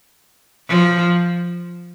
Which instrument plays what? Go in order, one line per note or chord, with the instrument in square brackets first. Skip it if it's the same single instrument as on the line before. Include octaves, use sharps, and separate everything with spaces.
[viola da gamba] F3